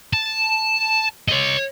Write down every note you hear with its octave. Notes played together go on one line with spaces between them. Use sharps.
A5
C#5 D#5